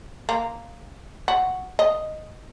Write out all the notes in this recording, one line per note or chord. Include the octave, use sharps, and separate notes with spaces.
A#3
F#4
D#5